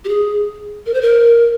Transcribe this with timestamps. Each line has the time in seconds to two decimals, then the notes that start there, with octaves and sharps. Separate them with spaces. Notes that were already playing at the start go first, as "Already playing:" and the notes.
0.05 G4
0.09 G#4
0.86 A#4
0.94 C5
1.02 A#4